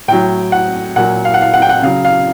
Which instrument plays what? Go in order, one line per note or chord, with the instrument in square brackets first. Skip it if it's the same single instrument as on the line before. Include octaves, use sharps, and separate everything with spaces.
[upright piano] A2 F#3 G5
F#5
A#2 F#3 F#5
F5
F#5
F5
F#5
G5
F#5
C#3 F#3 F5
F5